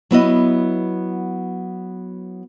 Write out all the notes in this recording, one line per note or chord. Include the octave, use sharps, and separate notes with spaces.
F#3 B3 E4 D#5